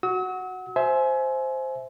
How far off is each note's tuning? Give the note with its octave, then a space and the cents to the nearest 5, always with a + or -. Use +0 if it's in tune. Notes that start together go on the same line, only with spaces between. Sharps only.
F#4 +0 E6 -45
C5 +0 E5 +0 G#5 +25